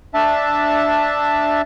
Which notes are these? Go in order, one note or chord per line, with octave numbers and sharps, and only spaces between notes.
D4 E5 A5